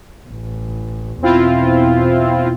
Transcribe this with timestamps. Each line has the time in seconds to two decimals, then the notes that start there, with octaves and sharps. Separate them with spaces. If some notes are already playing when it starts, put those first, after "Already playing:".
0.29 A1
1.22 E2 B2 C4 E4 F4